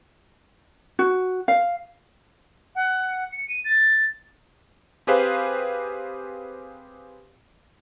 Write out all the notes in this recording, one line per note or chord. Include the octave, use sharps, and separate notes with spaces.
F#4
F5
F#5
C#7
D#7
A6
C4 G4 G#4 B4 C5 F5